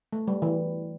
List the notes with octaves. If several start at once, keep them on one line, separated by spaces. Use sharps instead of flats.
A3
G3
E3